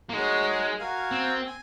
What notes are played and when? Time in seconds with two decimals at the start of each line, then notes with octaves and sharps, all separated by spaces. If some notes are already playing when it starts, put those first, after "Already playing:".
0.09 A#3
0.13 G#3 D#4 F#4 A#4 C#5
0.79 F#4 A#4 F5 G#5
1.12 C4
1.46 G#5